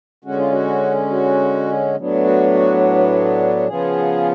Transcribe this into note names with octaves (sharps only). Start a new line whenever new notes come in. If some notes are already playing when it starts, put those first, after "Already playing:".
D3 G#3 C#4 F#4
F4
F#4
F#4
A2 F#3 B3 D4
F#4
F#4
C#3 F3 B3 F4 G#4